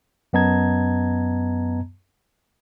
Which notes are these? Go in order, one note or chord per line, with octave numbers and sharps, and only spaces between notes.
F#2 B3 D#5 A5 A#5 G#6